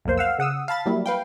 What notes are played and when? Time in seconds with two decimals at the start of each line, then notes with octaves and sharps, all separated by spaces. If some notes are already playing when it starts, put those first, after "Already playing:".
0.05 B1 F2 A#3 C5
0.17 F5 F#5 E6
0.38 C#3 F#5 D#6 E6
0.68 F5 A5 B5 A6
0.86 F#3 G3 A#3 E4
1.06 B4 F5 G5